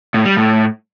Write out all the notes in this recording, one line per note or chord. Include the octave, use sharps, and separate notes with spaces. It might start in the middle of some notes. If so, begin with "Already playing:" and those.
A2
G3
A2